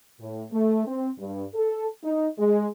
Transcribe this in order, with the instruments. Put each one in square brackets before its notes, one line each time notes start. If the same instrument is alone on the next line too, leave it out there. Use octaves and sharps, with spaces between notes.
[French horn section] A2
A3
C4
G2
A4
D#4
G#3